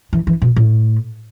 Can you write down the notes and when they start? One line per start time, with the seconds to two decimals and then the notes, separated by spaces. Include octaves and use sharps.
0.13 E3
0.27 E3
0.42 B2
0.56 A2